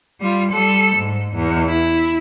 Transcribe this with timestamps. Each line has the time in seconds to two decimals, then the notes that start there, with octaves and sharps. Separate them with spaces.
0.21 G3 F4
0.51 G3 A4
0.96 G#2
1.35 E2
1.68 E4